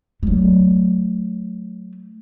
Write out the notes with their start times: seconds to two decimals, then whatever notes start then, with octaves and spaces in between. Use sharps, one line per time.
0.23 F#3 A3